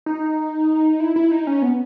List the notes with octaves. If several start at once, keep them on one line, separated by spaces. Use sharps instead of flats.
D#4
E4
E4
D#4
C#4
B3